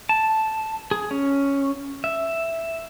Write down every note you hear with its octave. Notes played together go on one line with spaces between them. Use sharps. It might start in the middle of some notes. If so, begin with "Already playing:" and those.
A5
G#4
C#4
E5